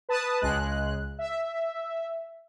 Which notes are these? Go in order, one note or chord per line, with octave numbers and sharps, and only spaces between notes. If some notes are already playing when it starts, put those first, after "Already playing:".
B4 A5 D#6
C#2 G#3 F#6
E5